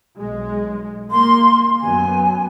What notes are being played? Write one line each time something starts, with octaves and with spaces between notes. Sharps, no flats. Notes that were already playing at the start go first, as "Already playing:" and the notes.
B1 G#3
A#3 C6
F#2 B3 G#5